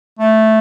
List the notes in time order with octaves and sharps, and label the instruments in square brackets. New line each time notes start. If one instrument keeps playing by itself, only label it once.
[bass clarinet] A3